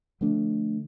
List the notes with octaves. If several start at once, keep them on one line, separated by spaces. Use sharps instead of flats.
D3 F3 A3 D4